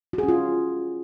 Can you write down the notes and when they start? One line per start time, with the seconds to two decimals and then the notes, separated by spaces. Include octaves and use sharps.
0.13 F#4
0.18 G#4
0.23 C#4
0.28 F4